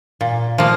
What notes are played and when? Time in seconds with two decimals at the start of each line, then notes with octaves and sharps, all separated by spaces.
0.21 A#2
0.58 F3 A#3